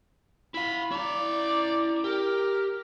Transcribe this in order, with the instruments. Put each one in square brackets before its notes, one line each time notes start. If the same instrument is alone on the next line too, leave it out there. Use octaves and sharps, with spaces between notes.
[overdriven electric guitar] E4 F5 [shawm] B5
[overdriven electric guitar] E4 A#5 [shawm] D5
[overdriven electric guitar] G4 [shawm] A#4